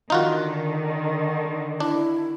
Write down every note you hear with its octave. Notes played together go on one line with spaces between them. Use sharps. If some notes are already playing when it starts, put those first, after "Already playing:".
D3 D#3 D#4 F4 F#4
D4 E4